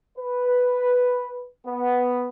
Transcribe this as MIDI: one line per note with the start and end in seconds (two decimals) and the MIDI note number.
0.18 1.48 71
1.66 2.27 59